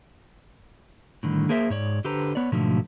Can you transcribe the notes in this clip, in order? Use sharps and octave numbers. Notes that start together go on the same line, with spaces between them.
A2 D3 D#3 G3
A#3 G#4 A#4 C5 E5
G#2 C#5 D5
D3 G4 A4 B4 C5 A#5
B3 C#5 D5
G#2 B2 D3 F3 F#3 A3